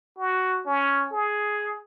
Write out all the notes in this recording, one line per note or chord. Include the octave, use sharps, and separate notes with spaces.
F#4
C#4
G#4